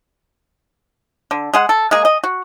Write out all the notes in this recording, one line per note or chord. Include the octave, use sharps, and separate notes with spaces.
D3
G#3 G#4 F#5
A4
G#3 A#3 G#4
D#5
F#4